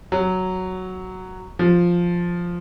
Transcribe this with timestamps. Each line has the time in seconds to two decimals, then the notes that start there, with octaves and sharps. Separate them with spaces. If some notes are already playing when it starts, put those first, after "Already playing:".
0.12 F#3
1.59 F3